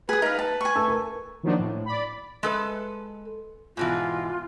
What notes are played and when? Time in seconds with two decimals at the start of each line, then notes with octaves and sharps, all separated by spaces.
0.09 G#4 B4 D#6
0.22 D#4 B4 F5
0.39 A5
0.61 G#5 C#6
0.76 A3 B4 A5 E6
0.88 A#4
1.43 D#3 F3 F#3 A#3 D4 D#4
1.59 A2
1.85 D5 B5
2.43 G#3 A4 B4
3.77 G#2 B2 E3 F4